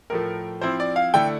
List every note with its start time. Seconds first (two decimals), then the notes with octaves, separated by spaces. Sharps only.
0.10 A2 F3 A3 A#4
0.61 F3 C4 E4 C5
0.80 D5
0.96 F5
1.14 D3 A3 E4 G5